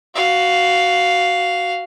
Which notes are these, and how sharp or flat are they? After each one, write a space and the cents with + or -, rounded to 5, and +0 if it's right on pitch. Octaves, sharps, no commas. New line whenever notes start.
F#4 +10 F5 +0